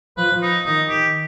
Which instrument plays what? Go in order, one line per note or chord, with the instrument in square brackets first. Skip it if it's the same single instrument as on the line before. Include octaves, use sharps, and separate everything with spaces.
[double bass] F3 [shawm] B4
[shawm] D#4
[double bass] D#3 [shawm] D#4
[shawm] G4